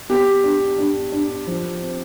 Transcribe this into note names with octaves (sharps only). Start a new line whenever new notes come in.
B3 G4
D4
D4
D4
F3
C4